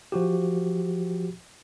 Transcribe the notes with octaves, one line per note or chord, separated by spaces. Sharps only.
F3 F#4 G4